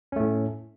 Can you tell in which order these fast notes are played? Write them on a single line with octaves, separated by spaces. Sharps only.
C#4 A3 A2